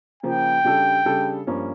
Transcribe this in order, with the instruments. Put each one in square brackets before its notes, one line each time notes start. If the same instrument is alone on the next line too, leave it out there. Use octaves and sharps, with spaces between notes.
[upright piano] C#3 F3 A#3 [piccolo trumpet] G5
[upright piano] C#3 G3 D4 A4
C#3 G3 D4 A4
G2 F3 A#3 C#4